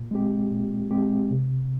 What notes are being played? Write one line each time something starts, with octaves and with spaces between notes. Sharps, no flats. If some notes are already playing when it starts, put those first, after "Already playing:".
Already playing: A#2
G#3 C4 G4
A#2
G#3 C4 G4
C3